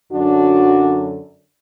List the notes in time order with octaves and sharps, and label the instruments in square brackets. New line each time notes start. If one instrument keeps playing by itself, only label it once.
[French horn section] F#2 D3 F#3 D4 F#4